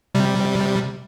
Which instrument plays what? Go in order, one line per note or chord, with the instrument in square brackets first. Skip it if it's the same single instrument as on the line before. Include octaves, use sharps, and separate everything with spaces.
[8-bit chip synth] C3 G3